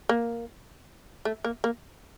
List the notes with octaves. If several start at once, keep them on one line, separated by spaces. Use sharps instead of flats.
A#3
A3
A#3
A#3